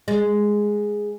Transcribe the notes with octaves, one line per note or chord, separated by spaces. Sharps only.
G#3